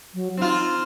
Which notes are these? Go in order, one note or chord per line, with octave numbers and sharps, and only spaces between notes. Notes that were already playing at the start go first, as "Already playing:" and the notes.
F#3
C4 D#4 F4